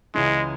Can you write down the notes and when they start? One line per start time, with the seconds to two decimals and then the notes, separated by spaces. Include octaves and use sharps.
0.15 C#2 C#3 E3 G#3